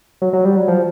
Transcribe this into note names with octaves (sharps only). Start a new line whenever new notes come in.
F#3
F#3
G3
F#3
F3